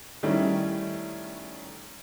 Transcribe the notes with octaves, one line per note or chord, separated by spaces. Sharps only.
D#3 G3 A3 C#4 E4